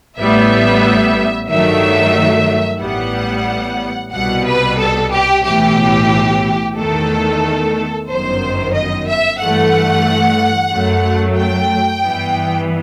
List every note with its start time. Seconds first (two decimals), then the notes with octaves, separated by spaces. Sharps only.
0.17 A1 A2 G3 B3 E5
1.49 G2 D#3 F#3 A3 E5
2.81 A1 A2 G3 B3 F#5
4.13 C2 B2 G3 B3 F#5
4.46 B4
4.79 A4
5.12 G4
5.45 B1 A2 E3 G4
6.76 E2 D#3 A3 A4
8.08 G1 F#2 D#3 C5
8.74 D#5
9.07 E5
9.40 G2 E3 A3 F#5
10.71 F#2 F#3 A3
11.37 G5
12.03 G2 E3 B3